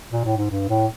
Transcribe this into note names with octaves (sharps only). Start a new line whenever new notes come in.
A#2
A2
G#2
G2
A2